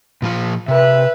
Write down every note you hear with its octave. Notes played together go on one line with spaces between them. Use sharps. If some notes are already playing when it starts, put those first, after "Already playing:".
A#2 F3 F4
C3 B4 E5